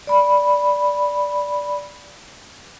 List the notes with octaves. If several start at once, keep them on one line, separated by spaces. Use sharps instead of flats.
D5 B5